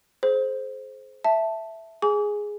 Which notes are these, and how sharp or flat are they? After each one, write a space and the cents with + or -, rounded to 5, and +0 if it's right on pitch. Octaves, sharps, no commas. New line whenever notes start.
G#4 +40 C5 +0
E5 +0 A5 +0
G#4 +0 G#5 +0 D6 -40